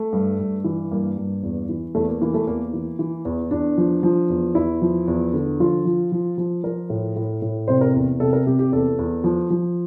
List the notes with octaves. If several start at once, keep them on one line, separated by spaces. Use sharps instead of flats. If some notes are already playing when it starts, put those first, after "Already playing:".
Already playing: A3
G2
G2
E3
G2 A#3
G2
E2
E3
E2 A3
A#3
E3 A#3
A3
E2 A#3
E3
E3
E2
E2 D4
F3
F3
E2
E2 E4
F3
E2
D3
F3 F4
F3
F3
F3
F3 A#4
A2
A2
A2
C3 C5
A#4
E2
C3 A4
A#4
C3 G4
G4
E2 A4
E2
F3
F3